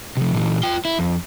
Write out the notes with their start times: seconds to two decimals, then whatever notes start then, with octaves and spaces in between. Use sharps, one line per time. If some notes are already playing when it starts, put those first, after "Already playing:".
0.17 C3 F3
0.34 A#2 E3
0.63 F4 G5
0.85 E4
0.99 F2